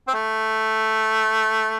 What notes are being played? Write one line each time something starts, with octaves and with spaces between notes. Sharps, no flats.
C4
A3